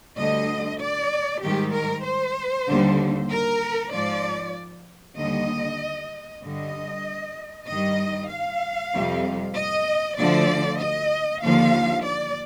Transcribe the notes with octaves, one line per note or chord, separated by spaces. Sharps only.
D2 D3 G3 D#5
D5
G#2 D#3 G3 G4
A#4
C5
D#2 D3 G3
A#4
G#2 F3 D5
D#2 D3 G3 D#5
G2 D3 G3 D#5
G2 D#3 G3 D#5
F5
F2 C3 G3
D#5
D2 D3 F3 D5
D#5
D#2 D3 F3 F5
D5